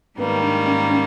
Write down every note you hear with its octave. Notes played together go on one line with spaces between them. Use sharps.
G#2 D#3 G3 A#3 B3
D4
C#4
C#4